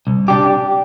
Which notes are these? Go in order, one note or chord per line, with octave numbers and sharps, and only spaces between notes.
C2
D4 G4